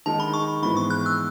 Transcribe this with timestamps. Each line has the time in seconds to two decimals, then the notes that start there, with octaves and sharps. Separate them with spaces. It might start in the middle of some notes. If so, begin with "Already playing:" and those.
0.06 D#3 G#3 D#4 A5
0.20 B5
0.33 C#6
0.62 G#2 E3 G#3 B3 B5
0.77 C#6
0.90 F#6
1.06 E6